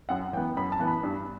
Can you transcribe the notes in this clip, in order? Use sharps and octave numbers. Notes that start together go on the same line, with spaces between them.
F#2 F#5
E3 B3 G5
F#2 B5
A5
E3 B3
B5
G2